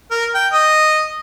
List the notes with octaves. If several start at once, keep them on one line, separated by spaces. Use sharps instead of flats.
A#4
G5
D#5